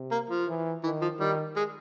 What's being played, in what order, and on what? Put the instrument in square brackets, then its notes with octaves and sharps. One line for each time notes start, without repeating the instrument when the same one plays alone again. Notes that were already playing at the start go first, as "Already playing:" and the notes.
Already playing: [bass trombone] C3
[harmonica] A#3
F3
[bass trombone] E3
[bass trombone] D#3 [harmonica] E3
[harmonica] F3
[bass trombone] D#3 [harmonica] G3
[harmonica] G#3